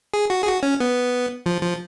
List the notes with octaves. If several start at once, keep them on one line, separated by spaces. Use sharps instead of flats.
G#4
F#4
G#4
F#4
C#4
B3
F3
F3